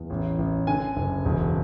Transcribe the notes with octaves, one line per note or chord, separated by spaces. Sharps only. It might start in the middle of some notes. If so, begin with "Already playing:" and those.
Already playing: E2
A1
A1
D3 G#5
F#1
E1